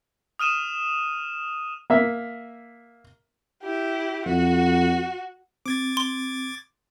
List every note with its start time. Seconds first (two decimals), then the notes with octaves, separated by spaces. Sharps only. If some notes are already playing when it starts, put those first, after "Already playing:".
0.39 D#6 F6 D#7 E7
1.90 A#3 E5
3.62 E4 G4
4.26 F2 F#4
5.66 C4 D6 G#6 A6
5.97 C6